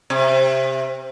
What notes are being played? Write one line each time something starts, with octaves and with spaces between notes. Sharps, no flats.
C3